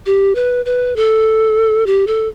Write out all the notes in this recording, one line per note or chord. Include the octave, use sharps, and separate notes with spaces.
G4
B4
B4
A4
G4
A4